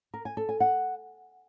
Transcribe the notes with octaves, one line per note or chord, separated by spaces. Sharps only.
A#4
G#5
A4
G#5
F#5